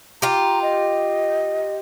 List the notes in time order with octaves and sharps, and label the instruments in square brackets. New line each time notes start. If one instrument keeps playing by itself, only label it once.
[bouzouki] F4 G4 [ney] A#5
[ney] D#5